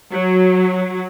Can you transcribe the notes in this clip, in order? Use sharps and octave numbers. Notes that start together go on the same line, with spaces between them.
F#3